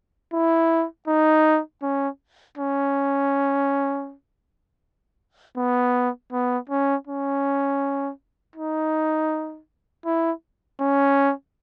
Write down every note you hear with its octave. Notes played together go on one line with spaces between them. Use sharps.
E4
D#4
C#4
C#4
B3
B3
C#4
C#4
D#4
E4
C#4